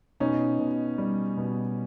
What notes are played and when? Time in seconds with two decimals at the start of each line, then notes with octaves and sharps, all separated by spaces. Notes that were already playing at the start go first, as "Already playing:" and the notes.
0.20 B2 C#4 D#4
0.59 B2
0.98 G3
1.37 B2